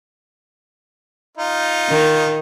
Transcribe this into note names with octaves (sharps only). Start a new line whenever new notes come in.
D#4 F4
D#3